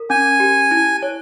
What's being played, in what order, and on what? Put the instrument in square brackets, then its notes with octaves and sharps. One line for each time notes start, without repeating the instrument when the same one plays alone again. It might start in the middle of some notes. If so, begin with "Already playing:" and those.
Already playing: [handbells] A#4
[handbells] C#4 [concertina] G#5
[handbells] G4
E4
C#5